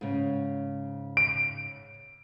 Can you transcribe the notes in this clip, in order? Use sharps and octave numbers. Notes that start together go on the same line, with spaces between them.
G#2 C#3
D7